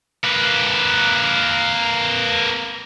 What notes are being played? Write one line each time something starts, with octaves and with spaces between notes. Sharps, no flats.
A#3 B4